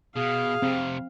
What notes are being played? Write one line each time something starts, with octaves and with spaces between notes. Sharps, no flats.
B2 G#4 F5
F2 C3 C4